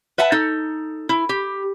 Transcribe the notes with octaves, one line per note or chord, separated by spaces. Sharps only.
B4 E5 F#5 A5
D#4 A4
E4
G4